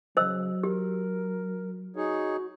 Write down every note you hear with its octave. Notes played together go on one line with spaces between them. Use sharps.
C#3 F#3 C5 D#5 E6
G4 A#4
D#4 F#4 G#4 C#5